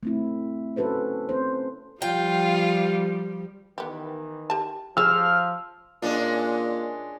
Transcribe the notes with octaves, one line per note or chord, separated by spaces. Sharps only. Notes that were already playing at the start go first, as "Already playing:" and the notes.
A3 C4 E4
C#4 F#4 A4 B4 C5
C4 C#4 C5
F3 G3 F4 G5
D#3 E3 B3 G4
G4 A5
F3 G4 G#4 C#5 E6 F6
A#2 G#3 C#4 D4